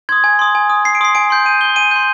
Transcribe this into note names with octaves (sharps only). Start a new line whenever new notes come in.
C6 D#6 G#6
G#5
C6 D#6
G#5
C6 D#6
G#5 C7
D7
C6 D#6 C7
G#5 D7
C6 G6
G#5 D#7
C6 G6 G7
G#5 D#7
C6 G6